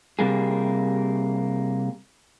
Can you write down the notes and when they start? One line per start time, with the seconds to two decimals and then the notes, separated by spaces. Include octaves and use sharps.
0.19 C3 G3 A#3 G#4